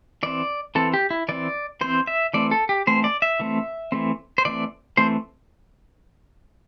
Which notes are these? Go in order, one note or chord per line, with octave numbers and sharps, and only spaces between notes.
E3 C4 D5
E3 C4 A4
G4
E4
E3 C4 D5
E3 C4 C5
E5
E3 A3 C4 D5
A4
G4
E3 A3 C4 C5
D5
E5
E3 A3 C4
E3 A3 C4
C5
E3 A3 C4 D5
E3 A3 C4 C5